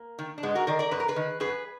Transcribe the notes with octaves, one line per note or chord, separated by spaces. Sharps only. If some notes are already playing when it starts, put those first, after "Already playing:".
Already playing: A#3
D#3
D4
G#2 G#3 B3
F#4 A#4
D#3 A#4 D5
A#4 D5
F#2 B4
A#4
G#4 B4
D#3
F#2 G#4 B4